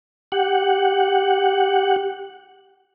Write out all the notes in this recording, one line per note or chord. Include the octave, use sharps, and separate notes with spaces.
G4 F#5